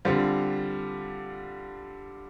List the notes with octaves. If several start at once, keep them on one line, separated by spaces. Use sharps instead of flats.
D3 G3 C4 F4